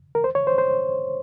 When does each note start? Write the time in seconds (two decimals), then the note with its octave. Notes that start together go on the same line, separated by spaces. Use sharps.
0.15 A#4
0.24 C5
0.35 C#5
0.47 C5
0.58 C5